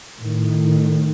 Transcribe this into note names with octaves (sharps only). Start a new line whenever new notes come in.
A2 D#3